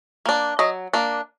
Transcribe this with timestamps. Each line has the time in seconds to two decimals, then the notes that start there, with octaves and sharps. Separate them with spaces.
0.26 A#3 D4
0.59 F#3 D#5
0.93 A#3 D4